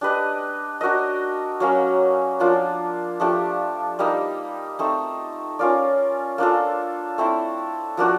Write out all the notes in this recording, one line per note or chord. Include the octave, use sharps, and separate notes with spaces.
D4 G4 B4 D#5
D4 F#4 A#4 D#5
F#3 A#3 C#4
F3 A#3 D4 F4
F3 A3 D4 G4
G3 A#3 D#4
A3 C4 D#4
C#4 F4 A#4 D5
A#3 D4 F4 A4
A3 C4 E4
F3 A#3 D4 F#4